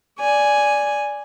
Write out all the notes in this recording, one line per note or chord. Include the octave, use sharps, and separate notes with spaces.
D5 G#5